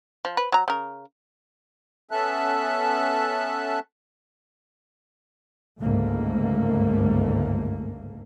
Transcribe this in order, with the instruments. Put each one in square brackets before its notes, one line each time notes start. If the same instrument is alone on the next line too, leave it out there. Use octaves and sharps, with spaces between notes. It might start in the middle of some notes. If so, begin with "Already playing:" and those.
[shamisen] F3
B4
F#3 A#5
C#3 A#4
[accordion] B3 C#4 A4 E5 A5 F#6
[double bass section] G1 C#2 G#2 A3 A#3